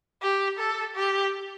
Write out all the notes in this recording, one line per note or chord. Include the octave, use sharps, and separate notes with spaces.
G4
A4
G4